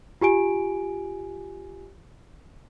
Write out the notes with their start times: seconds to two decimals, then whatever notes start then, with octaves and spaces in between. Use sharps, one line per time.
0.21 F4 G4 G#5 D7